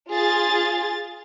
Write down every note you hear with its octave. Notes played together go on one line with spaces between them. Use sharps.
F4 G#4 A6